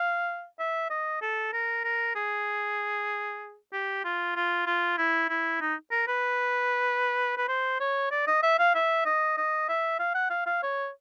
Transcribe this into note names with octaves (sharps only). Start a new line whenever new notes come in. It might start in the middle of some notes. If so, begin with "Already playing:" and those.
Already playing: F5
E5
D#5
A4
A#4
A#4
G#4
G4
F4
F4
F4
E4
E4
D#4
A#4
B4
B4
C5
C#5
D5
D#5
E5
F5
E5
D#5
D#5
E5
F5
F#5
F5
F5
C#5